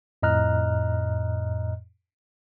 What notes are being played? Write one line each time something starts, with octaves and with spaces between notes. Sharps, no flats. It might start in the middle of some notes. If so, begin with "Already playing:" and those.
F2 A2 D#5 A#5 F6 F#6